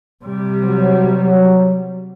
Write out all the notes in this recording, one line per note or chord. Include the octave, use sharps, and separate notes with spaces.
C3 G3
F#3